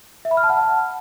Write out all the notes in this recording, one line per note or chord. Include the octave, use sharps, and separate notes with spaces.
E5
B5
F6
A5
F#5